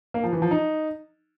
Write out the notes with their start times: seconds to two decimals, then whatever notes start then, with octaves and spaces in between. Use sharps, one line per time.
0.14 A#3
0.24 F3
0.33 E3
0.42 F3
0.51 D#4